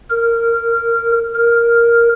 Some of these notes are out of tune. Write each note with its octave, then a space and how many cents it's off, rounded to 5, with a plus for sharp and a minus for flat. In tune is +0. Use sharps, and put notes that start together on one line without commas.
A#4 -15
A#4 +5